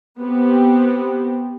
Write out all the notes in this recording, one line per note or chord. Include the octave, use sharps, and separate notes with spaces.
B3 C4 G4